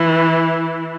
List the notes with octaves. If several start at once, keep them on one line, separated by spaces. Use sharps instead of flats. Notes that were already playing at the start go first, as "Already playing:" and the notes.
Already playing: E3